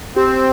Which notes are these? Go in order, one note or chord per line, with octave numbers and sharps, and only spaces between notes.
C4 G4